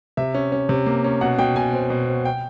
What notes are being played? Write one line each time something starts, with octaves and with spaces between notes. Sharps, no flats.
C3 E5
C#4
C#4
C3
A#3
C#4
B2 F#5
B2 G5
B2 G#5
C4
B2
C4
G5